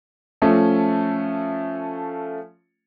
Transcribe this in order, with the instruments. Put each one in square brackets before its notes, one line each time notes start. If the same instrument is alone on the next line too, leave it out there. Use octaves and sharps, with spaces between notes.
[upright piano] F3 A3 C#4